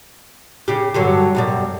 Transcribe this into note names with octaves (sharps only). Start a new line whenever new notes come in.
C#3 G4
G2 D3 F#3
F#2 B2 G3